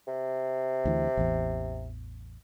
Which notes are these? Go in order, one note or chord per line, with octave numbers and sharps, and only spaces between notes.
C3
D2 E3
A1 E2